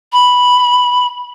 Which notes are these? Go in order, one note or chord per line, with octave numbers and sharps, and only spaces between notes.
B5